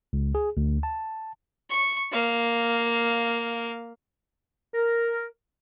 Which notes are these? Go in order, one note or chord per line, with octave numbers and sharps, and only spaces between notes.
C#2
G#4
D2
A5
C#6
A#3 F5
A#4